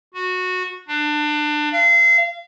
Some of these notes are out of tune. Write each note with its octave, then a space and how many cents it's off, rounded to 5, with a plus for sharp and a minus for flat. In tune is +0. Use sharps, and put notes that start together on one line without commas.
F#4 -15
D4 +25
F5 -30